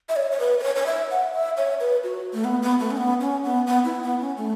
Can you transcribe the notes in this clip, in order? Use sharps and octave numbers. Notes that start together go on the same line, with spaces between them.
E5
C#5
C#5
B4
B4
C#5
C#5
E5
F#5
E5
C#5
B4
F#4
A3
B3
B3
A3
C#4
B3
C#4
B3
B3
E4
B3
C#4
A3